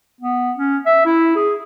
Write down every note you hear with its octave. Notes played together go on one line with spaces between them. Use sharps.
B3
C#4
E5
E4
G#4